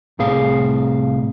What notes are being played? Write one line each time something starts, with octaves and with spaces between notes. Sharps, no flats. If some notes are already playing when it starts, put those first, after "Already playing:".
C2 A2 C4 G#4 F5